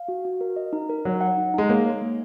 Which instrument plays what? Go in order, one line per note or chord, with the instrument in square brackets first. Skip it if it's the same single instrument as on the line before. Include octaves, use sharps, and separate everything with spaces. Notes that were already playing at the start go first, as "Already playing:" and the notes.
Already playing: [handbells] F5
F#4
F#4
A#4
D#5
D#4
A#4
[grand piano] F#3 [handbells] D#4
[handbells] F#5
D#4
[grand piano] G#3 [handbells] D#4
[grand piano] A#3 [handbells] C#5
[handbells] C#5
A#3